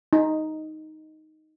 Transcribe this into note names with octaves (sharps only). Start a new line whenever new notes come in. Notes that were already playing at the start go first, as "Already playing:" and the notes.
D#4